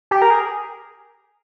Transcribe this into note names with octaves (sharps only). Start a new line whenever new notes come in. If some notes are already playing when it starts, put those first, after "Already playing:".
G4
A#4
G#4